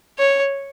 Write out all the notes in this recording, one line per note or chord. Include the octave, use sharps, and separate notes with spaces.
C#5